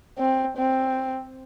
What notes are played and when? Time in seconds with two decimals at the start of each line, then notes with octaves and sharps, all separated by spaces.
0.18 C4
0.57 C4